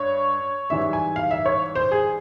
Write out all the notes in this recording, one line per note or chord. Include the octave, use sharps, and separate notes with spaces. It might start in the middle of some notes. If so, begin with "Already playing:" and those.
Already playing: G2 C#5
G#2 E3 G3 E5
G#5
F5
E5
C#5
C5
G#4